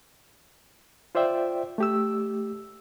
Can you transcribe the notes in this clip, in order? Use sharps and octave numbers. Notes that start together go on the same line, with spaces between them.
F4 C5 D5 E5 G5
A3 G4 E6